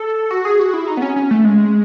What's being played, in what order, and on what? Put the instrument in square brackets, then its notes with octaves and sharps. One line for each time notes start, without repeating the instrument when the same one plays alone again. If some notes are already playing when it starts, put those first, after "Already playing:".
Already playing: [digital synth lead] A4
F#4
G#4
F#4
E4
D#4
B3
C#4
C#4
A3
G#3